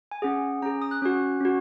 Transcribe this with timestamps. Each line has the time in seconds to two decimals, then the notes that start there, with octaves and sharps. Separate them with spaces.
0.11 G#5
0.22 C#4 G#4 F#5
0.62 C#4 G#4 A#5
0.82 D#6
0.91 F#6
1.02 C#4 F#4
1.41 C#4 F#4